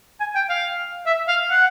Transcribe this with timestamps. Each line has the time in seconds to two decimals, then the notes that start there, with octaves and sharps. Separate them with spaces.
0.20 G#5
0.35 G5
0.49 F5
1.06 E5
1.28 F5
1.51 F#5